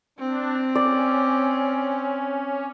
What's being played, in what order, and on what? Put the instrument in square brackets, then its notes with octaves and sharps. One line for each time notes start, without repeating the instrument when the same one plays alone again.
[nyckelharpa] C4 [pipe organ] D4
[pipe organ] C#4 [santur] D5